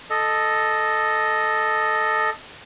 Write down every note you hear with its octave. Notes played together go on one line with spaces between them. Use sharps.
A4 D#5